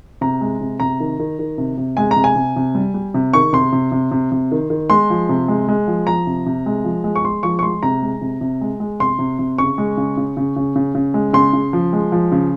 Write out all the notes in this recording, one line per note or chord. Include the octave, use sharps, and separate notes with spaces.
C3 A#5
G#3
C3
C3 A#5
D#3
D#3
D#3
C3
C3
G#3 G#5
A#5
C3
G#5
C3
C3
G3
G3
C3
D#3 C#6
C3 C6
C3
C3
C3
C3
D#3
D#3
G#3 C6
F3
C3
G#3
G#3
F3
F3 A#5
C3
C3
G#3
F3
G#3
C#6
G#3 C6
F3 C#6
C#6
G#3 C6
C3 A#5
G#3
C3
C3
G#3
G#3
C3 C6
C3
C3
C#3 C#6
G#3
C#3
C#3
C#3
C#3
C#3
C#3
G#3
C#3 C6
C#3
F3
G#3
F3
C#3